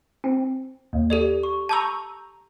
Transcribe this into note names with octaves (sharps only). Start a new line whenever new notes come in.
C4
D#2
G4 A4 D5
C#6
A5 A#5 C#6 E6 G6